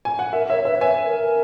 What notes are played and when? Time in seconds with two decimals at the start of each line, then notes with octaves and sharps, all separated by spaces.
0.05 G#5
0.19 F#5
0.33 A#4 E5
0.49 C#5 E5
0.65 B4 E5
0.75 C#5
0.81 B4 E5 G#5
1.05 A#4